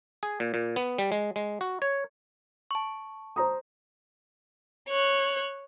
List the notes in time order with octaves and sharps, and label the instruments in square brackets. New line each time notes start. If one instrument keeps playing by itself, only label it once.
[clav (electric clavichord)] G#4
A#2
A#2
B3
G3
G#3
G#3
F#4
C#5
[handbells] A5 C#6
[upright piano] C5 A#5 D#6
[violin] C#5 F#6